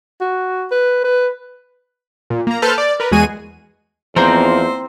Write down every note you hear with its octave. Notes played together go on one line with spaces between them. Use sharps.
F#4
B4
B4
A#2
A#3 A#5
A4 B4 C5 A5 F6 G6
D5
A#4 B4
E2 G#3 F#4 G#4 G#5 D#7
E2 F3 A#3 C4 D#4 C5 A#5 G6